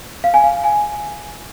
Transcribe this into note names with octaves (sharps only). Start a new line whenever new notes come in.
F5
G#5
F5
G#5